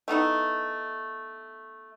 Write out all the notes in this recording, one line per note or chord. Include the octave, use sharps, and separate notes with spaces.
A3 B3 D#4 E4